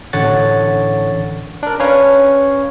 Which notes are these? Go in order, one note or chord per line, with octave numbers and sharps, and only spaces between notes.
A1 D3 C#5 F#5 A6
D4 A#4
C#4 B4 C#5 F5